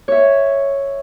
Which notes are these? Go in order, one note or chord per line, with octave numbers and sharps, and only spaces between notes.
C#5 E5